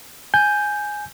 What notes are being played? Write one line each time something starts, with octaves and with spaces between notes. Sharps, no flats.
G#5 G6